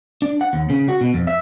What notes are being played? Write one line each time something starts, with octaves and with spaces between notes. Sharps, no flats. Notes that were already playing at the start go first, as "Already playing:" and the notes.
D4
F#5
D#2
C#3
F#4
B2
F2
E5